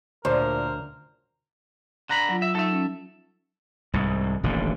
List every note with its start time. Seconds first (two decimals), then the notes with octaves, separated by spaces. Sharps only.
0.25 D2 A#2 A#4 C5 C#5 A5
2.09 D3 A#5 B5 F#6
2.29 F#3 F4
2.42 E5
2.55 F#3 D#4 A4 E5
2.72 C#4
3.94 C2 G#2
4.43 D#1 A1 A#2 D3